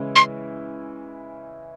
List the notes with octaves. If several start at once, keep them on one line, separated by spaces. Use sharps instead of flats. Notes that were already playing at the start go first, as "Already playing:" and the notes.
Already playing: C#3 E3 G#3 C#4 E4
C6